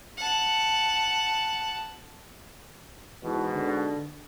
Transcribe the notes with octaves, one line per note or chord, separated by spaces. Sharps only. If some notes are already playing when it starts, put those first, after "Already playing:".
F#5 A5
G#2 B2 E3
D3